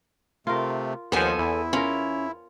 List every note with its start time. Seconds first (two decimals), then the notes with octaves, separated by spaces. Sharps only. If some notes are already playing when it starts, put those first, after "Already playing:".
0.47 C3 A3 F4 A#4
1.12 D#2 F3 B3 A4 C5 F#5 G#5
1.38 E2 E4
1.73 C#4 F4 A#4